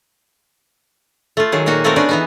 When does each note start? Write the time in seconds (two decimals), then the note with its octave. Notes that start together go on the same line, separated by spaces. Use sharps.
1.37 A3 F4
1.52 D#3 F#3 G#4
1.66 A#2 A#3 D#4 F#4
1.84 A3 A#3 C4 F#4 A#4
1.96 A3 B3 C#4 D4 G#4 D5
2.09 E3 B3 D#4